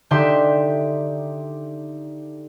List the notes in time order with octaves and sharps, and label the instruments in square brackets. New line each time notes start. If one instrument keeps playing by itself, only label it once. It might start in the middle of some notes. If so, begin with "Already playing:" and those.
[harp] D3 D#4 G4 E5 C6